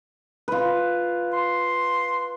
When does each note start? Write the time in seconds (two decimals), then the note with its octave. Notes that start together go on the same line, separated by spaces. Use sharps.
0.48 F4 B4
1.33 C6